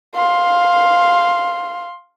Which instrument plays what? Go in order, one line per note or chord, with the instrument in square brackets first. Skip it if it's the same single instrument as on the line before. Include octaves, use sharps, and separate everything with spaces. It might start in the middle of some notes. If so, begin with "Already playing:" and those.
[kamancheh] F5 C6